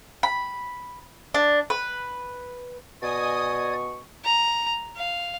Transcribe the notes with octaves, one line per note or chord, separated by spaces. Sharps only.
B5
D4
B4
B2 D5 D#5 G#5 C#6 D#6 G#6
A#5
F5